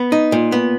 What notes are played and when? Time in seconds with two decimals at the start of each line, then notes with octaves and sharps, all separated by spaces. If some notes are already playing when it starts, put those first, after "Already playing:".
Already playing: B3
0.12 D#4
0.32 A#2
0.52 B3